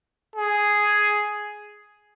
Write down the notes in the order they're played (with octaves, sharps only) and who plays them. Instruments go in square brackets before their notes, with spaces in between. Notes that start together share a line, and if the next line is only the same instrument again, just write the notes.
[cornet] G#4